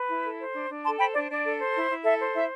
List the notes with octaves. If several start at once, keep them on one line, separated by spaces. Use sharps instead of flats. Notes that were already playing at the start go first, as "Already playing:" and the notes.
Already playing: B4
E4
A4
C5
D4
D4
A4 A5 C6
C5 G5 B5
D4 D5
D4 D5
A4
C5
E4
E4
A4 E5
C5
E4 E5